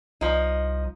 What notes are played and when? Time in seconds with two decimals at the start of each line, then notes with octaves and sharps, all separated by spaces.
0.21 C2 F3 D#4